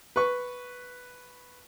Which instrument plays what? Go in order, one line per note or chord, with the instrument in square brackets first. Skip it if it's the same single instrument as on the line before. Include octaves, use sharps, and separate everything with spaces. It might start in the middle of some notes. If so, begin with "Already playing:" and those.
[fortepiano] B4 C#6